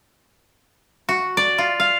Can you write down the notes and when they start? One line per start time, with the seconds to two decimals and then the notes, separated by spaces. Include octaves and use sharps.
1.09 F#4
1.37 D5
1.58 F4
1.80 F5